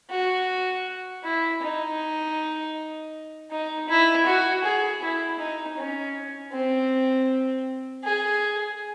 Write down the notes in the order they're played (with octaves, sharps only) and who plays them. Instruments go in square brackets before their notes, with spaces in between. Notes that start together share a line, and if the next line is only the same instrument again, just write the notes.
[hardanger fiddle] F#4
E4
D#4
D#4
E4
F#4
G#4
E4
D#4
C#4
C4
G#4